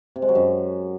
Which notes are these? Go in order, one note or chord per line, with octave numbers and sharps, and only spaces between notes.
C3
G#3
F#3
F#2